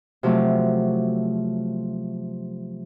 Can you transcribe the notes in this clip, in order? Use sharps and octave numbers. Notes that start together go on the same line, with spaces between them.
C3 F3 F#3 A3